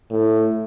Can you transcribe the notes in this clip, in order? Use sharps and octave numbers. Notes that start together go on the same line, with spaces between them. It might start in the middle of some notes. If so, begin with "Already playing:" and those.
A2